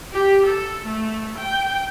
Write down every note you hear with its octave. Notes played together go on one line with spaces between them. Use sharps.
G4
A4
A3
G5